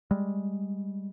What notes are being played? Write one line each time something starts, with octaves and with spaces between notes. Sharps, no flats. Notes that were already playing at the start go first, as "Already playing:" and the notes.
G3 G#3